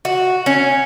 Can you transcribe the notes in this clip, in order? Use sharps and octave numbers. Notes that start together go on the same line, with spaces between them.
F#4
C#4